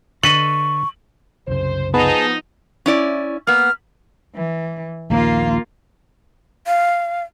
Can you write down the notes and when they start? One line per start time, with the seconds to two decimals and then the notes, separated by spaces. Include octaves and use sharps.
0.23 D3 A4 B4 D#5 C#6 F#7
1.47 C2 F#2 C#3 C5
1.94 F3 B3 D#4 G#4 A5
2.86 C#4 E4 D5
3.47 A#3 B3 F6
4.35 E3
5.10 A#1 D#2 A#3 F4
6.66 F5